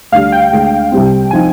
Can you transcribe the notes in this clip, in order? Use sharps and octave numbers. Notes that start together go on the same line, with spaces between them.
D2 D3 G3 F5
G5
D2 D3 G#3 D4
C2 C3 G3 C4
F3 C4 D#4 G#5